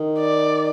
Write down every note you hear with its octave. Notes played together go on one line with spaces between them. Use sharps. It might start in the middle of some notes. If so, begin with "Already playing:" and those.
Already playing: D#3
D5